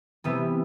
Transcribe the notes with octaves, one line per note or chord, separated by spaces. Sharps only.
C3 E3 G3 B3